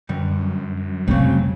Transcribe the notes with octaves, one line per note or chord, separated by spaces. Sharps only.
F#2 D3 G3
F1 C#3 F#3 G3 C4 C#5